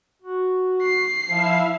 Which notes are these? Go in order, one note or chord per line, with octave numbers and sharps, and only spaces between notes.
F#4
C7
F3 E4 E5 F5